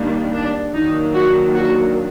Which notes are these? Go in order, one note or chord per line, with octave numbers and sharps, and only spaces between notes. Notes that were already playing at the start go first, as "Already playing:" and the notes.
Already playing: D#3 G3 A#3 D4
D4
D#3 F#3 A#3 D4 D#4
F#4
F#4